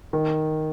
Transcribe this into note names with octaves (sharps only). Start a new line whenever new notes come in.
D#3